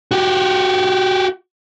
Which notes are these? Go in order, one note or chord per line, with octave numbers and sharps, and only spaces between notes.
F#4 G4